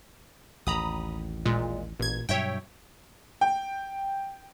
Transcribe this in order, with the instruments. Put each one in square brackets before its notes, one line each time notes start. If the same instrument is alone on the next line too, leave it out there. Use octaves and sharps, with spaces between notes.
[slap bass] A1 D#2 [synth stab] A#5 B5 D#6
[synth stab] A#2 G#3
[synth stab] A1 G#6 [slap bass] A#2
[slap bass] G2 B2 F#3 [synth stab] C#5 E5 G5
[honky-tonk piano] G5